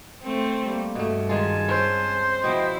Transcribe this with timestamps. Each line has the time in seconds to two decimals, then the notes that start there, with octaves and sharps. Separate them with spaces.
0.24 A3 C4 C5
0.63 G3 A#3
0.95 G2 B2 A3
1.29 D#3 G#3 F4 G#5 A5
1.69 C4 C#4 C5
2.44 B2 F3 E4 D#5 G5